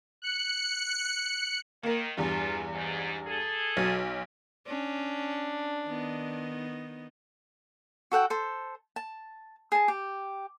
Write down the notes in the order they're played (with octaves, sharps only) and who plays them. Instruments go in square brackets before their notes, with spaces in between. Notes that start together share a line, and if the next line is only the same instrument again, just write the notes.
[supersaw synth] F#6 C#7
[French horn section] D#3 [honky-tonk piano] A#3 A#4
[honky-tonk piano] E2 G2 [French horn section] F3 A3 F4
[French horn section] G#2
G#4 A4
[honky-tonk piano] B1 F#3
[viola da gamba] C#4 [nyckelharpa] D4
[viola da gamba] D#3 B3 D#4
[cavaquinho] F#4 A4 F#5 G5
A4 C5
A5
G#4 A5
G4